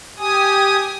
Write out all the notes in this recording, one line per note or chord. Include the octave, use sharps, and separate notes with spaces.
G4 G#5 D#6